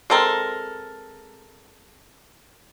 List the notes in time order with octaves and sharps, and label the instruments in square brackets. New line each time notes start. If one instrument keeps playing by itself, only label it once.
[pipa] G#3 C4 A4 A#4